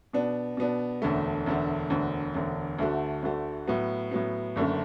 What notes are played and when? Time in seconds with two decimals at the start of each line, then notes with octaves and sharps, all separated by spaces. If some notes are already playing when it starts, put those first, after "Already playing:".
0.13 B2 B3 D4
0.57 B2 B3 D4
1.02 E1 D2 D3 A3
1.46 E1 D2 D3 A3
1.90 E1 D2 D3
2.34 E1 D2 D3
2.79 D2 D3 A3 F#4
3.22 D2 D3 A3 F#4
3.68 A2 F#3 B3
4.11 A2 F#3 B3
4.56 F#1 F#2 D3 A3